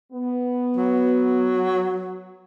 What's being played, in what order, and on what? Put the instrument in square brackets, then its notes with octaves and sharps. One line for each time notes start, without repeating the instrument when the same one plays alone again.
[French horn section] B3
[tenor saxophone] F#3